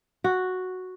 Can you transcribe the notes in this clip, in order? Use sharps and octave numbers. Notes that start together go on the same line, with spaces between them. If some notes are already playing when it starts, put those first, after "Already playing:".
F#4